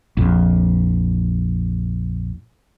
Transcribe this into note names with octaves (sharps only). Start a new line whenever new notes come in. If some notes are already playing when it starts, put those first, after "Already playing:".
A#1 F2